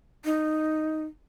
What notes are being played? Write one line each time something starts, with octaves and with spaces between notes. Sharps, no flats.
D#4